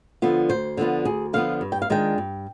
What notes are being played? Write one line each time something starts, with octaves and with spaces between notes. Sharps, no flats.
D3 F3 B3 F4
D2 C5
D3 F3 B3 F4
D2 G#4
D3 F3 B3 F4 F5
G2
G5
F5
D#3 G#3 D4 F4 G5
G2